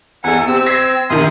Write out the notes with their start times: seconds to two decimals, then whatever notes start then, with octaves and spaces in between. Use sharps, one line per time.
0.24 E2 A4 F#5 G#5
0.47 C4 G4 E6
0.66 G#6 A#6 C7
1.10 A#1 D#2 D#3 C6 D#6